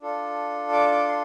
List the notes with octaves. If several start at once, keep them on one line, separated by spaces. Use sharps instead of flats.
D4 F4 A4
D6
D6
C6